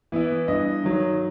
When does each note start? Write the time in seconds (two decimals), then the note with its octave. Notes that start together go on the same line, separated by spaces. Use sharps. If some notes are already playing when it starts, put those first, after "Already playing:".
0.12 E3 B3 E4
0.47 G2 D#5
0.84 D#3 F#3